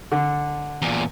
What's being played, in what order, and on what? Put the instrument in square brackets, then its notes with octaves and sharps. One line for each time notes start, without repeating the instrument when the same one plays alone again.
[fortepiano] D3
[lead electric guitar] E2 A#2